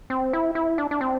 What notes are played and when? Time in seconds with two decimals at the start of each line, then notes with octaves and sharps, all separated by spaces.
0.10 C4
0.33 E4
0.55 E4
0.78 D4
0.91 D4
1.01 C4